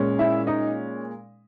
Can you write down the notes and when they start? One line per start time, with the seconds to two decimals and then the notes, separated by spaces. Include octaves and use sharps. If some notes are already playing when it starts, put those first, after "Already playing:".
Already playing: A#2 G#3 C#4
0.19 E4 E5
0.47 D#4 D#5